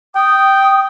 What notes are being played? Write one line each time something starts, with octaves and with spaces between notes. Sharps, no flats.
G5 D#6